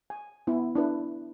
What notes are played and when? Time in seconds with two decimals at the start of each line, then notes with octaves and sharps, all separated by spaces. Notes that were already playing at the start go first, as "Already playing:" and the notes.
0.10 G#5
0.47 B3 E4
0.75 D4 E4 B4